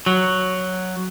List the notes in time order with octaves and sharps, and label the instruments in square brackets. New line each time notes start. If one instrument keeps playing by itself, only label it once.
[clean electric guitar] F#3